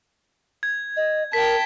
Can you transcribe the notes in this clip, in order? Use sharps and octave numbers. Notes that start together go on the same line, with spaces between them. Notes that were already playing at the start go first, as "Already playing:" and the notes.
G#6
D#5
A#4 G5 A5 B6